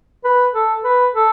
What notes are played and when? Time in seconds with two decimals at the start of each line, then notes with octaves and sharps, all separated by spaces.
0.24 B4
0.54 A4
0.84 B4
1.14 A4